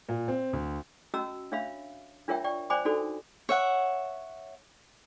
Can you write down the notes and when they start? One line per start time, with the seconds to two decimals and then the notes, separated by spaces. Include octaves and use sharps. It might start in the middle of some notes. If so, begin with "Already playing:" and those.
0.09 A#2
0.28 C4
0.53 D2
1.14 C#4 F#4 D#5 A#5 E6
1.52 D4 C#5 E5 F5 B5
2.28 D4 F4 A#4 C#5 E5 G5
2.44 D5 G5 C#6
2.70 C5 D5 G5 G#5 B5 D6
2.85 D4 D#4 F#4 A4 D5 B5
3.49 C#5 E5 F#5